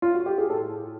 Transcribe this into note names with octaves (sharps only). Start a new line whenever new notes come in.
F4
F#4
G4
G#4
A2 A4